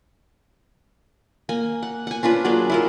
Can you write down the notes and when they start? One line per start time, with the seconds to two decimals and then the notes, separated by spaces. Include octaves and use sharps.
1.49 A#3 G#5
1.83 F#5
2.07 F#5 G#5
2.23 C#4 D4 F4 B4
2.44 F#3 A#3 G#4 D5
2.70 E4 F4 A#4